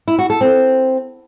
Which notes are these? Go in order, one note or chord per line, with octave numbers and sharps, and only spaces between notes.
E4
F#4
A4
C4